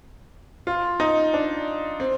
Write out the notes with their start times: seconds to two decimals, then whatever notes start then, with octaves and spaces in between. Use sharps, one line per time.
0.67 F4
1.00 D#4
1.34 D4
2.00 C4